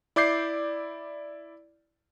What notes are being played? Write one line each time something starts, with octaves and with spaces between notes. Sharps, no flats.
E4 D5 D6 G6 C7